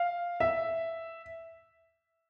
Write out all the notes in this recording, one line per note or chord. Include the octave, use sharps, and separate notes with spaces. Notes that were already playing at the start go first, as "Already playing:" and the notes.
Already playing: F5
E5